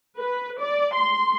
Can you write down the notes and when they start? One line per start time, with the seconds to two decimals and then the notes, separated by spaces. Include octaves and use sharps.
0.18 B4
0.60 D5
0.94 C6